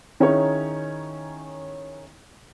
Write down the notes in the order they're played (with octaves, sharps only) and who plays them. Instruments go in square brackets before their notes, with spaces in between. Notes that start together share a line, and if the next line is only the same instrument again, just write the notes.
[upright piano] D#3 C#4 D#4 E4 G#4 C#5